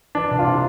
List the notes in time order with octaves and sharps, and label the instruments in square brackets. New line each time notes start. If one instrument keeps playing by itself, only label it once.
[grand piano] E3 D4
C2
F4
C3